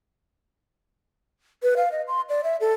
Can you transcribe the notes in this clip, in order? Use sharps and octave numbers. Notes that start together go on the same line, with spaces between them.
B4
F5
D#5
C6
D5
E5
A4